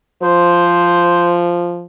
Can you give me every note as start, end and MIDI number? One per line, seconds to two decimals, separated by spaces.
0.23 1.86 53
0.23 1.42 72